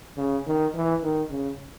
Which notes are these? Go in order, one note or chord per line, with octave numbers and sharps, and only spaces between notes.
C#3
D#3
E3
D#3
C#3